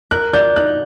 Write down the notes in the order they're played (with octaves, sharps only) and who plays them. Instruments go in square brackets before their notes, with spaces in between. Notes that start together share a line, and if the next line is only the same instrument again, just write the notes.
[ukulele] A#4 [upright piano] F#6
[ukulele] D5 [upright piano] G6
[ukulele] D#4 [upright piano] F#6